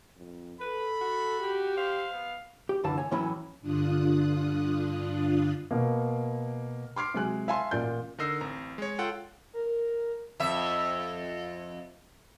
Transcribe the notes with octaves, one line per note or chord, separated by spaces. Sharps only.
F2
A4 B4 B5
F#4
G4
C5 F5
B3
G4
C2 F#2 D3 E3 A5
C#5 G#5
A2 E3 F#3 C#4 E4 B5
G2 D3 D4 F4 D#6 F#6
B2 A#3
C6 D6 F6 C7
C3 F#3 G#3 G#5 F#6
E5 F5 G#5 A5 C6
A1 A#2 D5 G6
D3 D#4 A#4 D#5 E6 C7
A1 C4 A#5
G#3 C#5
F4 A4 F#5 G5
A#4
F2 E5